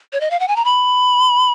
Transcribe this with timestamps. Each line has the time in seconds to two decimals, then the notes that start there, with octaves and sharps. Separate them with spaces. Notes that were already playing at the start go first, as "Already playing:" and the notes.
0.13 C#5
0.21 D#5
0.31 F5
0.40 F#5
0.48 G#5
0.56 A#5
0.65 B5